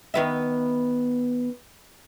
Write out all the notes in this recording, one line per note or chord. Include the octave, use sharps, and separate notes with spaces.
D#3 B3 E5